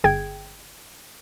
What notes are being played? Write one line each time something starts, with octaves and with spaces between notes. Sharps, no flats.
G1 G#4 G5 G#6